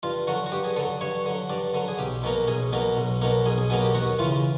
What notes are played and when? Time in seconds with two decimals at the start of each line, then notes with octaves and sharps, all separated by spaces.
0.03 G2 F4
0.27 D3 F#3 F#4
0.46 F#4
0.52 G2 G4
0.64 G#4
0.76 D3 F#3 A4
1.01 G2 C#5
1.25 D3 F#3
1.50 G2 D5
1.74 D3 F#3
1.88 G#4
1.98 B1 G4
2.23 B2 F#3 A#3
2.48 B1 G#4
2.72 B2 F#3 A#3
2.97 B1
3.22 B2 F#3 A#3
3.46 B1 G#4
3.58 G#4
3.70 B2 F#3 A#3 G#4
3.82 G4
3.94 D#2 F#4
4.19 E3 F4
4.22 C#3